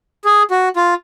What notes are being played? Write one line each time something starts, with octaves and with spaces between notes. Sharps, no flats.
G#4
F#4
F4